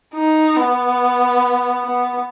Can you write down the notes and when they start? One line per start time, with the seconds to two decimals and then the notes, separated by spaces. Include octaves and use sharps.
0.14 D#4
0.57 B3
1.86 B3